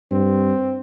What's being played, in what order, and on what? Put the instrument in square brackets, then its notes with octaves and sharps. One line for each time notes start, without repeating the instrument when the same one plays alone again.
[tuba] G2 [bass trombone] C4